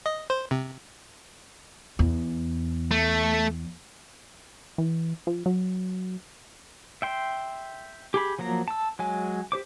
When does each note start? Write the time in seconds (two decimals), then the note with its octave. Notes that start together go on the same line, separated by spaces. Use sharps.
0.06 D#5
0.30 C5
0.51 C3
1.99 E2
2.91 A3
4.78 E3
5.27 F3
5.46 F#3
7.02 E5 G5 C6
8.14 G4 G#4 B5
8.39 F3 F#3 A#3 A#5
8.68 A5 E6
8.99 F#3 G#3 G#5
9.52 G4 C5 D6